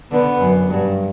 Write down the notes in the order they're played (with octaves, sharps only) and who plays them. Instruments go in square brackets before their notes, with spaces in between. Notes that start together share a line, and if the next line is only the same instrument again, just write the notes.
[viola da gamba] D3 [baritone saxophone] B3
[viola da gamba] F#2
G2